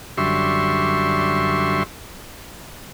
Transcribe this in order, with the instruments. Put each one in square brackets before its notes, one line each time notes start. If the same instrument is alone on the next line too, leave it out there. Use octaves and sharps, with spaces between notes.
[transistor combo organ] F#2 D3 G3 E5 C6 C#6